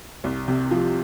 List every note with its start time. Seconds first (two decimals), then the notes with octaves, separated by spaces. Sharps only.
0.24 C2
0.48 C3
0.71 F3